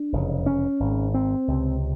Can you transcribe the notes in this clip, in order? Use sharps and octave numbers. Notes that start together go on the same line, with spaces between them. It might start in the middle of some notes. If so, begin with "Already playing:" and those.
Already playing: D4
F1 E2 C#3
C#4
G#1 G#2
C4
C#2 C3